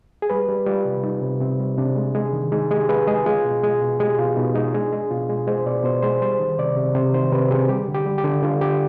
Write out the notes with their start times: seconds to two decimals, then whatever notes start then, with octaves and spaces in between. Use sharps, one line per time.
0.22 G#4
0.30 G3 B4
0.48 G3
0.66 G3 F4
0.85 C3
1.04 G3 D#4
1.22 C3
1.40 C3 C4
1.60 G3
1.78 C3 D4
1.96 G#3
2.15 G#3
2.33 D#3
2.52 G#3 D#4
2.71 G#3 G4
2.89 G#3 B4
3.07 G#3 G#4
3.26 G#3 F4
3.45 B2
3.63 G#3
3.81 B2
4.00 G#3 G4
4.19 B2 F4
4.36 B2 D#4
4.54 G#3 D#4
4.73 G#3 D4
4.93 G#3
5.11 B2 F4
5.29 G#3
5.47 G#3 C5
5.66 B2 D5
5.84 B2 C5
6.02 G#3 C5
6.21 G3 C5
6.39 D#3
6.58 C3 D5
6.77 C3
6.95 C3 C5
7.13 D#3 C5
7.32 C3 B4
7.50 C3 G#4
7.69 G3 G4
7.88 D3
7.94 G4
8.06 G3
8.18 G4
8.24 D3
8.43 D3 F4
8.61 D3 G4